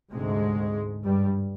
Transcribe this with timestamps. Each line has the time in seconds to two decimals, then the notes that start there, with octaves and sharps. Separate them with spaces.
0.12 D2 G#2 C3 G#3
1.04 G2 G3